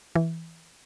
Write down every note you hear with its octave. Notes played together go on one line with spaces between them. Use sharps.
E3